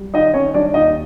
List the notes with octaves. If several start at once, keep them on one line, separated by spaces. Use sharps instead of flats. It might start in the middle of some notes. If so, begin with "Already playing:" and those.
Already playing: G3
D#3 D#4 D#5
D#3 C#4 C#5
G3 D4 D5
D#2 D#4 D#5